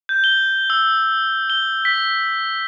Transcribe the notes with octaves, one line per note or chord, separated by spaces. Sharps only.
G6
G7
E6
G7
B6